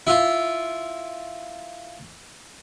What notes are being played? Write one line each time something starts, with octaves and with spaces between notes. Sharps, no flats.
E4 F4